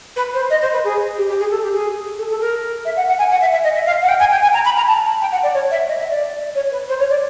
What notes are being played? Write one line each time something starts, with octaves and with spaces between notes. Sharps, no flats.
B4
C5
D#5
C5
B4
G#4
G4
G4
G#4
A4
G4
G#4
A4
A4
A#4
E5
F#5
F#5
G#5
F#5
E5
E5
D#5
E5
F5
F#5
G5
G#5
G5
G#5
A#5
B5
A#5
A5
G5
F#5
D5
C#5
E5
D#5
E5
D5
C#5
B4
C5
C#5
D5